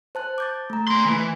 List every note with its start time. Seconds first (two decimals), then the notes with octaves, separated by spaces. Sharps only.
0.15 C5 A5 F#6
0.38 D6 G6 A6
0.70 A3 A#5
0.88 A#3 C6
1.06 E3